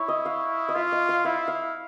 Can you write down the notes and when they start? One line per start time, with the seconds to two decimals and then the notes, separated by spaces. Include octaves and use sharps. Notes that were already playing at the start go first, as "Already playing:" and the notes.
Already playing: E4 C#5
0.08 D#5
0.25 F5
0.69 D#5
0.75 F4 E5
0.92 D#5
1.09 F5
1.25 E4 F5
1.48 F5